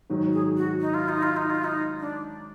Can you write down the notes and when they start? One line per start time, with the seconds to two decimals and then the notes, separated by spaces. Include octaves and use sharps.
0.10 G#2 D#3 F#3
0.33 G#4
0.57 F#4
0.81 D#4
0.94 F4
1.09 D#4
1.23 F4
1.37 D#4
1.50 F4
1.64 D#4
2.00 D4